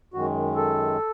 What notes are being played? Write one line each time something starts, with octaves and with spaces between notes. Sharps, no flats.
F#2 D#3 G#3 F#4
A4